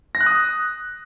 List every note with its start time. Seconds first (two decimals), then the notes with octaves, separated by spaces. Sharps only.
0.15 A#6
0.21 F#6
0.26 D#6